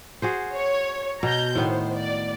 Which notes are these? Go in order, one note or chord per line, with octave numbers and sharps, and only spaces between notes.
F#4 G#4 C5
C#5
B2 A#5 G6
A2 D#3 B3 C5
D5